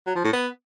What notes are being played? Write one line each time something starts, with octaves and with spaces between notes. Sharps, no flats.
F#3
F3
A2
B3